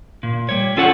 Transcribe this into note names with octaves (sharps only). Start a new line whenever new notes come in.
A#2
G3 C#5
C#4 F4 A4 C#5 F#5